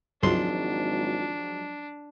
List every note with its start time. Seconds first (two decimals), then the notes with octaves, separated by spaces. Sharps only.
0.23 G#1 C#2 G2 F3 F#3 G#3 D4 C6